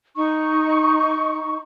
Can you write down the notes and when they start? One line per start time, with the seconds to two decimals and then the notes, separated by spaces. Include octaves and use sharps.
0.16 D#4 C#6